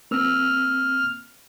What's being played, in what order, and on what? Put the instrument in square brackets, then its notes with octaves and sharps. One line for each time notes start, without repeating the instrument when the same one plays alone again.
[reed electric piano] A#3 C4 E6 [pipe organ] F6